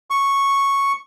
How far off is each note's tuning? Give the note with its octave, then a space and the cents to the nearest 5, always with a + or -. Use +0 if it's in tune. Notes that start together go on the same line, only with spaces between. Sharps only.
C#6 -5